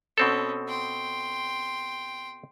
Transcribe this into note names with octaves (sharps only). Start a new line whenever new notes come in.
B2 C4 C#4 A4
G5 C6